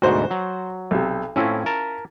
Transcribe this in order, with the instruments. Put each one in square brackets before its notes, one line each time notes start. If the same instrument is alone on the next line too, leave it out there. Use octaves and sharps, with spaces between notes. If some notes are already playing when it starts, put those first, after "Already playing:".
[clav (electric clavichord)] D2 G#2 B2 [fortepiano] F#4 C5
[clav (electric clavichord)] F#3
[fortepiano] B1 C3
[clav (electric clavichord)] A2 C4 [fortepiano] C#4 E4 F4
[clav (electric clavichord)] A#4 A5